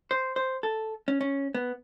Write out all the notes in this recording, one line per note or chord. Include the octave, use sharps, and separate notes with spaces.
C5
C5
A4
C#4
C#4
B3